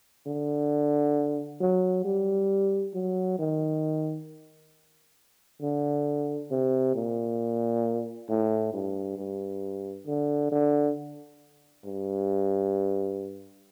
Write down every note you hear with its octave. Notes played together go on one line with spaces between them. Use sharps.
D3
F#3
G3
F#3
D#3
D3
C3
A#2
A2
G2
G2
D3
D3
G2